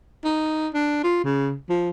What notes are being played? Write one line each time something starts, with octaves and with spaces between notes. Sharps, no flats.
D#4
D4
F4
C#3
F3